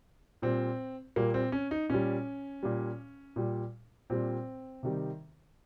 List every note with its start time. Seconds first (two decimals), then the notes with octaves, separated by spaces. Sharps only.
0.42 A#2 G3 C4
1.16 A#2 G3 A#3
1.34 C4
1.52 C#4
1.71 D#4
1.90 A#2 G3 C#4
2.63 A#2 G3
3.36 A#2 G3
4.10 A#2 G3 C4
4.83 C3 D#3 G3